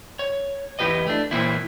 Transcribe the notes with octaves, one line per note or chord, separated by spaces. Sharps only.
C#5
E2 G3 E4 G4 B4 D#5
A3 D4
A#2 E3 A#3 C4 E4